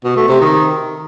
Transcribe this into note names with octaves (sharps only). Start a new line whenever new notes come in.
B2
A3
C3
D#3